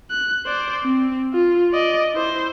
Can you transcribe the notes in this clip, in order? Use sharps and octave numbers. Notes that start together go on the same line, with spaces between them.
F#6
C5 D5
C4
F4
D5 D#5
E4 C5